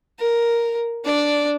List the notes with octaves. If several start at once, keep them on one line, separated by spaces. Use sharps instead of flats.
A#4
D4 D5